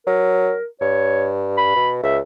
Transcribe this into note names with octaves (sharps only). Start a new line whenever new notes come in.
F#3 A#4
G2 C#5
B5
B2
C#2 E5